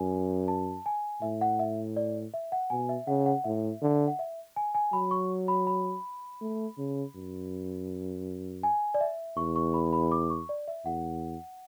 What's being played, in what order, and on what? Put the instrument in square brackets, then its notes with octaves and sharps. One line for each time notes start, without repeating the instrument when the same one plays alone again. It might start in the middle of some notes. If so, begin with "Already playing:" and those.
Already playing: [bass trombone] F#2 [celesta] G#5
[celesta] A5
G#5
[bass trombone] A2 [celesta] E5
[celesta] F#5
E5
D5
E5
F#5
[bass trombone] B2 [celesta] G#5
[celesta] E5
[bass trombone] C#3 [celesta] F#5
[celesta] F#5
[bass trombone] A2 [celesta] E5
[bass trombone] D3
[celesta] F#5
E5
G#5
G#5
[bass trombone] F#3 [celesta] B5
[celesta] C#6
B5
B5
[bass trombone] A3
C#3
F#2
[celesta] G#5
D5
E5
[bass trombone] E2 [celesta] C#6
[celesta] C#6
B5
B5
D6
C#6
D5
E5
[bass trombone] E2 [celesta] F#5